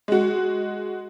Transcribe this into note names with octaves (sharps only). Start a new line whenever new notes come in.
G#3 F#4